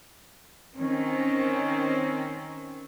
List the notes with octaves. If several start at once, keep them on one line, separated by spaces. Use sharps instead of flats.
D#3 C4 C#4